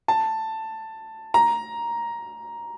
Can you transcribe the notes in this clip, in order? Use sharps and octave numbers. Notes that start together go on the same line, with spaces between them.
A5
A#5